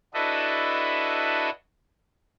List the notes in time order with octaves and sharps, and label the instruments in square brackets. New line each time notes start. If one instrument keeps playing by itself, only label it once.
[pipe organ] D4 E4 F#4 A4 B4 D#5